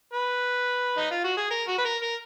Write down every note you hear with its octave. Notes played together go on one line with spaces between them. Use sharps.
B4
D#4
F4
F#4
G#4
A#4
F#4
B4
A#4
A#4